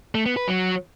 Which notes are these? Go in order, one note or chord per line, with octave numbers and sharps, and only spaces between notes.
A3
B3
B4
F#3